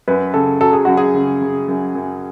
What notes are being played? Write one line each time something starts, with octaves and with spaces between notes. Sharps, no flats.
F#2 B4
C#3 A4
F#3 A4
G#4
F#2 F#4
G#4
C#3
C#3
F#2
F#2